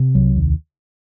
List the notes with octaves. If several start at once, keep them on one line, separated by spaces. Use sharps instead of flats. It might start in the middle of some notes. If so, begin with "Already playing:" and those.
Already playing: C3
C2 F#3
D#2